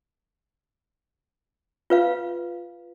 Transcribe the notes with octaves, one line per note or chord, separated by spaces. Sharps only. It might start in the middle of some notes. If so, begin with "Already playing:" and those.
F4 B4 F5